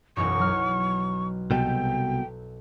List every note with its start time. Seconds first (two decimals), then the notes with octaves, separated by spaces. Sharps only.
0.17 E1 B1 F#2 C#6
0.39 F#3 F6
1.51 C2 B2 A4 G5 G6